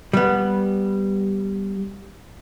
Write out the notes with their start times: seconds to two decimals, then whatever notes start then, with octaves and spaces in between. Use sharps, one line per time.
0.13 G3 B3